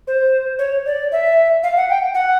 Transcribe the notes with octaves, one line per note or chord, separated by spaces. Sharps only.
C5
C#5
D5
E5
F5
F#5
G5
F#5